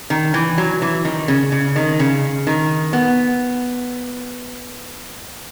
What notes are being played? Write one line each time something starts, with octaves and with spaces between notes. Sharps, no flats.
D#3
E3
F#3
E3
D#3
C#3
C#3
D#3
C#3
D#3
B3